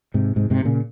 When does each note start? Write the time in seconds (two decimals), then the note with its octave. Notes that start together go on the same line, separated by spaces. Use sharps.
0.14 G#2 C3
0.36 G#2 C3
0.50 G#2 C3
0.65 A#2 C#3